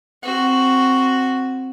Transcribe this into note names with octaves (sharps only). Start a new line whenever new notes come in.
C4 F#4